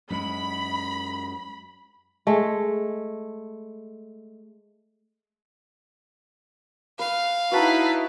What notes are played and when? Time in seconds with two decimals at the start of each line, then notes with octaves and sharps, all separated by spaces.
0.10 F#2 G#3 B5
2.27 G#3 A3
6.99 B4 F5
7.51 D#4 E4 F#4 B4 A5 A#5